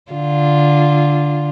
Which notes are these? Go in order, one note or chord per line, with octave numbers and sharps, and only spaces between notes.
D3 F4